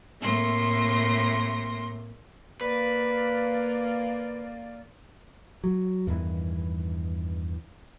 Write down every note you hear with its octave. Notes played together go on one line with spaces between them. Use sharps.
A2 C3 A3 A#3 C6 A#6
A#3 F4 B4 D5
F#3
E2 G2 D#3 E3